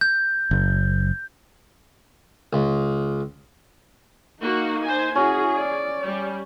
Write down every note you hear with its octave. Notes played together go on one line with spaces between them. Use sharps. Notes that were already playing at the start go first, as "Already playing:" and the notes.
G6
F#1
C#2
A#3 D#4 F#4
C5 G#5
C#4 E4 F#4 G#4
D5
G3